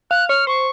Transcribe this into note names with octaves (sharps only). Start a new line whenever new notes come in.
F5 F#6
C#5 F6
C5 C#6